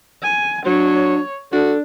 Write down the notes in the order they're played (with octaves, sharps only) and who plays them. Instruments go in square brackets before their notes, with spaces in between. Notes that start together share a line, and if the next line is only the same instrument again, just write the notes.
[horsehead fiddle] G#5
[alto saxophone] F#3 [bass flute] D4 [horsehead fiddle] C#5
[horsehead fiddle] D4 [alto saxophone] F#4 [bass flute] A4